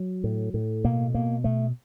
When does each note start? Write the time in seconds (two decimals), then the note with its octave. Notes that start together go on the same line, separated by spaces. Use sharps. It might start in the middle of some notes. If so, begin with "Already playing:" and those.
Already playing: F#3
0.24 A2
0.54 A2
0.84 B2 A#3
1.14 B2 A#3
1.44 B2 A3